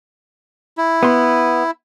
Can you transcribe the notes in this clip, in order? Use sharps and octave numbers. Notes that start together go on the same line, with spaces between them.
E4
B3 C6